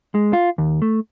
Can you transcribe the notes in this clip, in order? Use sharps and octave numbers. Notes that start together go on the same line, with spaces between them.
G#3
F4
D#2
A3